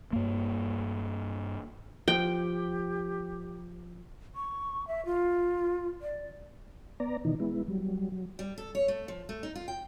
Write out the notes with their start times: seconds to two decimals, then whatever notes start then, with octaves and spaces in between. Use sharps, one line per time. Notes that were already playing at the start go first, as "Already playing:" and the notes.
0.13 G2 A#3
2.08 F3 G4 G5
4.35 C#6
4.88 E5
5.05 F4
6.02 D5
7.00 B3 D5 A#5
7.25 B2 D#3 E3 D#4
7.40 G#3 B3 E4
7.68 F#3 G3
8.12 F#3
8.39 G3
8.58 A4
8.75 C#5
8.88 A3
9.08 F3
9.29 A3
9.43 D#4
9.56 F4
9.68 G5